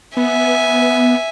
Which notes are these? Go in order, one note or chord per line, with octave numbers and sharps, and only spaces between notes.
B3 E5 G#5